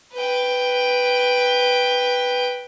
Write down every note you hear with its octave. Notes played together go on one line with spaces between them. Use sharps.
B4 G5